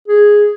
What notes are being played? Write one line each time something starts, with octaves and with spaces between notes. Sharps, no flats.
G#4